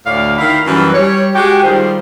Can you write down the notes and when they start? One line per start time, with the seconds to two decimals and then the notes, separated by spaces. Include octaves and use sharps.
0.06 D2 A2 D5 F5
0.38 D#3 E4 F5
0.67 F#2 E3 G3 B4
0.94 G3 C#5
1.34 G#3 F#4 G4
1.63 D#3 G3 F4 G#4 C5